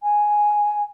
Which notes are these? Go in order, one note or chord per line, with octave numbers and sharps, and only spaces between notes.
G#5